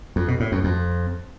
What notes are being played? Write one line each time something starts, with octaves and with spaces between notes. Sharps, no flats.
F2
B2
A2
F#2
F2